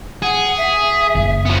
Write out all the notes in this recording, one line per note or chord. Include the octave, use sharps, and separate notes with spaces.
G#4 F#5
E5
F#1
F3 B3